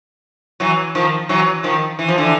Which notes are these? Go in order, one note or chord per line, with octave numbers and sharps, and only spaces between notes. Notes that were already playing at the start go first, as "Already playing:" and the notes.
E3 F#3
D#3 F3
E3 F#3
D#3 F3
E3
F3
D3 E3